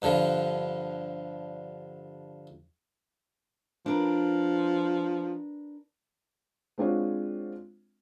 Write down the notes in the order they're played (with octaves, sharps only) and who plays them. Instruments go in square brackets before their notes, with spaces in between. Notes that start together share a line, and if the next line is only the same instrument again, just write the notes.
[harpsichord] G2 D3 F3
[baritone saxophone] F3 [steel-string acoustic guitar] D4 A#4 B4
[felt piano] G#3 C4 D4 F4 F#4 C#5